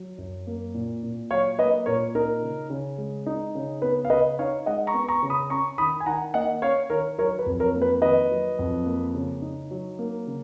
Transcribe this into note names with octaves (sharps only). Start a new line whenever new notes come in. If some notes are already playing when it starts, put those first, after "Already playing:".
Already playing: F#3
F#2
A#3
A#2
A#2
F#3 C#5 F5
A#3 B4 D#5
A#2 A#4 C#5
D#4 A#4
C#3
C#3
G#3
D#4
C#3
B3 B4
F5
C#3 B4 D#5
D#4 C#5 F5
G#3 D#5 F#5
A#5 C#6
B3
A#5 C#6
C#3
B5 D#6
C#4 A#5 C#6
D#3 B5 D#6
G#5
D#3 F#5 A#5
A#3 D#5 F#5
C#4 C#5 F5
D#3 A#4 C#5
F#3 A#4 C#5
B4
F2
A#4 C#5
A#3
B4
D#3 B4 D#5
F#3
F2
A#3
C#3
D#4
F#3
A#3
C#3